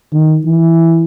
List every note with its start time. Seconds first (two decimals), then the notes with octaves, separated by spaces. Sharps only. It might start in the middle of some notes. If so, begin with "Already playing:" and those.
0.13 D#3
0.46 E3